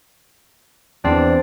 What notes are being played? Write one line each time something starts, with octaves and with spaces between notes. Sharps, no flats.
E2 C4 D4